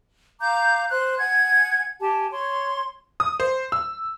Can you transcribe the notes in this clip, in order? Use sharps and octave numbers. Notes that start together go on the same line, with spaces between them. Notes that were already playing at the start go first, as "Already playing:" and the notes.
F5 A#5 D6 G6
C5 F#6
F#5 G#5 G#6
G4 G#5 A5
C#5 C6
D#6
C5
E6